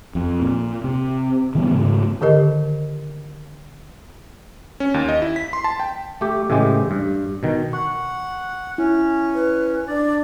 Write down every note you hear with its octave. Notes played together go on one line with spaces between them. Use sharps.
F2
A#2
C3
D#3 E3 G3 B3
G#2 C#3 A3
D3 D#3 G4 A#4 D#5
C#4
D#2
D#5
E4
B6
C6
A5
G5
A3 G4
A2 C#3 E3 G#3 G4
G2
B2 D#3
F#5 C#6
C#4 E4
B4
D4 D5